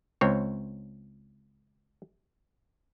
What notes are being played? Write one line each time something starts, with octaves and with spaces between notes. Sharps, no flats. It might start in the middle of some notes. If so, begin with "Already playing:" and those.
C#2 C4 C#5